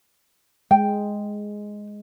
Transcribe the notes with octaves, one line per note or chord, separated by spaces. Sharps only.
G#3 G5